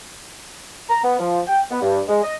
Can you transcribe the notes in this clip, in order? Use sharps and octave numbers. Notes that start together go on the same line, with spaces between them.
A#5
B3
F3
G5
B3
G2
G#3
D#5